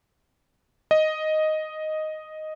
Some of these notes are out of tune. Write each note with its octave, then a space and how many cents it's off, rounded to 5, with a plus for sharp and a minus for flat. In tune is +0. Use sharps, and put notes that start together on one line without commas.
D#5 +0